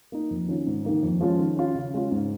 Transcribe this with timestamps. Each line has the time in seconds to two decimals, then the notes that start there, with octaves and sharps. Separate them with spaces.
0.12 A#3 D#4
0.31 F2
0.48 D#3 C#4 F4
0.67 G#2
0.84 D#3 A#3 D#4
1.03 F2
1.21 F3 G#3 C#4 F4
1.39 D#3
1.57 C#4 F4
1.75 C#3
1.94 G#3 C#4 F4
2.11 G#2